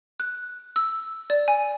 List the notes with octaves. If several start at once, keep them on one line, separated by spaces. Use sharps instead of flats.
F#6
E6
D5
G#5